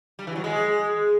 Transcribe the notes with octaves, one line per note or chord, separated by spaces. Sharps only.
G3
E3
F#3
G#3